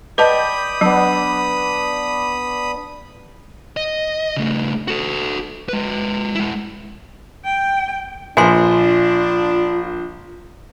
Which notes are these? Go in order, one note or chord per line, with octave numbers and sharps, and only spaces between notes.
B4 D5 D#5 G5 A5 B5 D#6
F#3 B3 D4
D#5
C#3 A3
F#4 A4
G#3 B4
G#3 E4
G5
A#1 D4 F4 G#5 C6